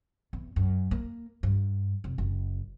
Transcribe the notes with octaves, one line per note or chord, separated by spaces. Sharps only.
E2
F#2
A#3
G2
F1
F#1